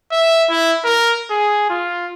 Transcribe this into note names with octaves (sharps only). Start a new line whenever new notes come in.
E5
E4
A#4
G#4
F4